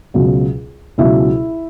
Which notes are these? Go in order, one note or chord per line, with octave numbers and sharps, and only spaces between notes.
C#2 B2 F#3
C#2 B2 F#3 E4 E5